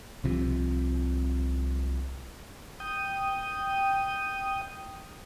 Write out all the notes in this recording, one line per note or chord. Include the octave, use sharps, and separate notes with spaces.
C2 C3 F3
G5 D#6